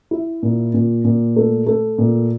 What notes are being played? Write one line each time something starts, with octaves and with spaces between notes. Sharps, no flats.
E4
A#2
A#2
A#2
A3
A3
A#2